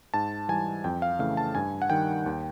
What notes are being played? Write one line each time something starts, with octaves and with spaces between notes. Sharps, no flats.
G#2 A5
E3 G3 G#5
F2 G5
F5
C#3 E3 A3 F5
A5
G2 G#5
F#5
D#3 G3 G5
D#2